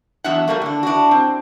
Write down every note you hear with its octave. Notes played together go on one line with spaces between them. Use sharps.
E2 F#3 D4 F#4 E5 F#5
G3 A3 A#3 F#4
D3 D4
D4 E4 F#4
C4